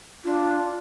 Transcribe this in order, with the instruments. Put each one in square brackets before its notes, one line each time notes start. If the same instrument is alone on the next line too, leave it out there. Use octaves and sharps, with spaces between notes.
[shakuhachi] D4 [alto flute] F4